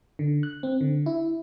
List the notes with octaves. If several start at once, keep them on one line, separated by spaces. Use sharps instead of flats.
D3
F#6
C4
D3
E4